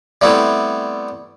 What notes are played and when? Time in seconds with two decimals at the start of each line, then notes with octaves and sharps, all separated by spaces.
0.21 G3 A3 B3 C4 E4